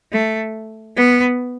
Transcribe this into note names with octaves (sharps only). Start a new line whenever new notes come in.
A3
B3